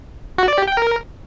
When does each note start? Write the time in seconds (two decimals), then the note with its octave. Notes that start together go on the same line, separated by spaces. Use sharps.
0.38 F#4
0.48 D5
0.58 G4
0.68 G5
0.77 A#4